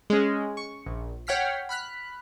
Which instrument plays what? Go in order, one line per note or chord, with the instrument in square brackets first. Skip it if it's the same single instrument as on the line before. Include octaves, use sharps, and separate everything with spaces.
[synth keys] G#3 C#4
C#6
A#1
C#5 F#5 G5 F6 B6 C7
B5 F6 F#6 B6